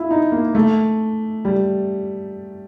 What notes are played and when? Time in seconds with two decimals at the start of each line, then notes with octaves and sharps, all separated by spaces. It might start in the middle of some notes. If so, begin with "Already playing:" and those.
Already playing: E4 F4
0.11 D#4
0.32 A#3
0.55 A3
1.45 G3